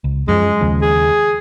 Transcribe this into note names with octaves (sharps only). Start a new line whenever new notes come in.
C#2
F#2 F3 G#3
D#2 C#3 F3
G#4